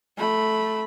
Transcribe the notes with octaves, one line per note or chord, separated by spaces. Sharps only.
A3 B5